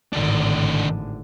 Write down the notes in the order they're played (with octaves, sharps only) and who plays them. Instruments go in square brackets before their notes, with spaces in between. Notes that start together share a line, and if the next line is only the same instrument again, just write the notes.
[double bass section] G#1 A2 D3 [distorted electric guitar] D#3 D4